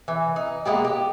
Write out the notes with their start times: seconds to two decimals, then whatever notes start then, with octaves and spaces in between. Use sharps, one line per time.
0.08 E3
0.36 D#4
0.65 G#3 A#3 B3 G4
0.84 G4